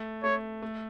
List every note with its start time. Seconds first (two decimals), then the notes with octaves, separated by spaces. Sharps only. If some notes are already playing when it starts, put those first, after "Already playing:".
Already playing: A3
0.23 A3 C#5
0.62 A3